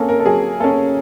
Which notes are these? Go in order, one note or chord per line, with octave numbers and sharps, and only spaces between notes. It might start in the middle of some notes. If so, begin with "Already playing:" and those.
Already playing: A#3 C#4 G#4 A4
A#4
A4
F#3 G#4
A#3 C#4 A4